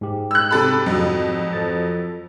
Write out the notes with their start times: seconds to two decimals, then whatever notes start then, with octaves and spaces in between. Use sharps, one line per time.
0.01 G#2 G4 G#4
0.31 E6 F#6
0.51 C3 A4 B5
0.86 F2 F#3
1.53 F3 A4 A6